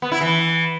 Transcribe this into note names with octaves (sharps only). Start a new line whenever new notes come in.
B3
E4
E3